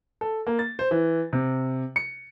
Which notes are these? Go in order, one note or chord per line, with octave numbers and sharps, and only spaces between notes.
A4
A#3
A6
C5
E3
C3
C#7